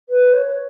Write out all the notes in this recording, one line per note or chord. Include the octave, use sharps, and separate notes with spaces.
B4
C#5